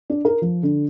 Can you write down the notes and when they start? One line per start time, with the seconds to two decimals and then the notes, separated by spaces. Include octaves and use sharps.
0.10 D4
0.25 A#4
0.42 F3
0.63 D3